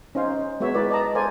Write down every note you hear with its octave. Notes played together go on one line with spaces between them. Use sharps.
C#4 D#4 C5 F5
G#3 B3 F#4 C#5 E5
G#3 E4 A#4 B4 D5
D5 D#5 A5 A#5
A4 A#4 C5 D5 F5 G#5